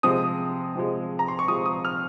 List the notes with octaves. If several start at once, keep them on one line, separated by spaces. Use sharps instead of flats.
C3 F3 G#3 D#6
C3 F3 G#3
A#5
C6
C#6
C3 F3 G#3 D#6
D#6
F6